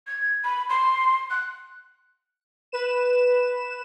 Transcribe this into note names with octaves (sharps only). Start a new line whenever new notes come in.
G#6
B5
C6
F#6
B4 E7